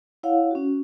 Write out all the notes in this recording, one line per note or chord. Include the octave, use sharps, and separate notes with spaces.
E4 C#5 F5 F#5
C#4 F#4